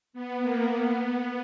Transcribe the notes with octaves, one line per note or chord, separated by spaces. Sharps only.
B3
A#3
B3